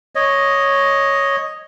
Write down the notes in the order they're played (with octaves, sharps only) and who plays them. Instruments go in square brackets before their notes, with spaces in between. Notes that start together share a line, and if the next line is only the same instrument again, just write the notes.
[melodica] C#5 D#5